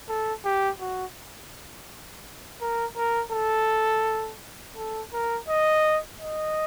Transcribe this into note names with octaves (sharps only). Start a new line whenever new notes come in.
A4
G4
F#4
A#4
A#4
A4
A4
A#4
D#5
D#5